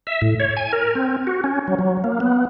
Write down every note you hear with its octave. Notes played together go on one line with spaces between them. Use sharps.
E5
A2
C#5
G#5
A#4
C4
F#4
C#4
F#3
F#3
A#3
B3